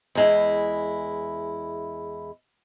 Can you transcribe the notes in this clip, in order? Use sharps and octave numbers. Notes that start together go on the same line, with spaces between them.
E2 G#3 E4